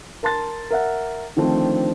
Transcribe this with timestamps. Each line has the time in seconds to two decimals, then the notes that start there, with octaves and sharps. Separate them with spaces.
0.23 A#4 A5 C6 A6
0.71 A#4 E5 F#5
1.36 D3 D#3 F3 A3 C4 D4